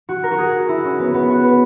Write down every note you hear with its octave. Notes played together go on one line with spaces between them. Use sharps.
F#4
A#4
F#4
G#4
E4
C#4
B3
B3
F#4
B4